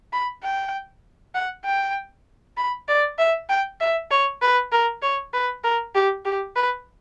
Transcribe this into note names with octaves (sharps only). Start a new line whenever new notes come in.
B5
G5
F#5
G5
B5
D5
E5
G5
E5
C#5
B4
A#4
C#5
B4
A#4
G4
G4
B4